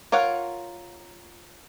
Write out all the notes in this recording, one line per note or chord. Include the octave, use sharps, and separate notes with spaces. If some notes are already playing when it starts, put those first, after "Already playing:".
F4 A#4 C#5 F5 F#5